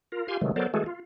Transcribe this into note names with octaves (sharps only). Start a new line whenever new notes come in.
F4 A#4
F4 G4 F5 G#5 C6
C3 D#3 E3 F#3 G#3 A3
F#3 B3 A4 A#4 C5 D5
E3 G#3 A3 F#4 G#4 A4
F4